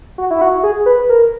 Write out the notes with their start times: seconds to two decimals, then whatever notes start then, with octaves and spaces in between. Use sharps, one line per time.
0.18 F#4
0.31 E4
0.41 F#4
0.63 G#4
0.86 B4
1.09 A#4